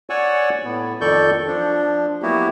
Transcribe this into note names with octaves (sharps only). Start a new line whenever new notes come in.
C#5 D5 F#5 G#5 C#6 E6
A2 B3
F2 D#3 A4 D5 C#6 G6
F3 D4
F#3 A#3 B3 E4 F#4 G4